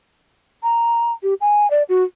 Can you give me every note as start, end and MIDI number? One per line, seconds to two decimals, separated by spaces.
0.63 1.12 82
1.23 1.34 67
1.41 1.69 80
1.71 1.83 74
1.89 2.04 66